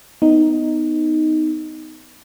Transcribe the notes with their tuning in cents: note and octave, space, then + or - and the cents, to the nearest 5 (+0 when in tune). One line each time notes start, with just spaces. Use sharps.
B3 +25 D#4 +0